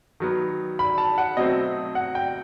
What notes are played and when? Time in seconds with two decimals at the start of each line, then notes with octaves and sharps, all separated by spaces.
0.20 D#3 F#3 B3
0.79 B5
0.98 A5
1.18 F#5
1.37 B2 F#3 A3 C4 D#5
1.95 F#5
2.15 G5